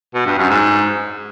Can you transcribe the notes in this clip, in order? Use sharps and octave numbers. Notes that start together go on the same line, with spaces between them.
B2
G2
F#2
G#2